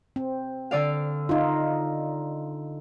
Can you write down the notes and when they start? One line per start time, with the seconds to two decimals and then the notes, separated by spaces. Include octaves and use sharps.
0.16 C4
0.71 D3 D5 F5
1.29 D#4 F4